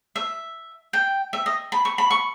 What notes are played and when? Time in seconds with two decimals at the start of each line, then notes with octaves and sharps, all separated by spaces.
0.16 E5
0.93 G5
1.33 E5
1.46 D#5
1.72 B5
1.85 C#6
1.98 B5
2.10 C#6